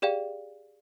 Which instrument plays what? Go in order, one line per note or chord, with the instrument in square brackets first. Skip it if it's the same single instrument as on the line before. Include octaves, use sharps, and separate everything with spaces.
[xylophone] G4 G#4 D5 F5 G5